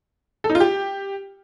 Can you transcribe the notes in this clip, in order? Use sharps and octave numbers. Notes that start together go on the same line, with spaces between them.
A4
D#4
F4
G4